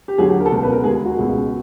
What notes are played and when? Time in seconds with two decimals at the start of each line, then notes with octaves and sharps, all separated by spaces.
0.08 G4
0.18 D#2 D3 F#3 G#4
0.29 G4
0.40 A#4
0.46 A4
0.51 C#2 B2 G#3 A#4
0.63 B4
0.72 A#4
0.84 D#2 D#3 G#3 G#4
1.05 F#4
1.17 C#2 B2 G#3